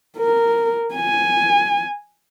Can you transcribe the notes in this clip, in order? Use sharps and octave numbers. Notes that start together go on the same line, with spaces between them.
A#4
G#5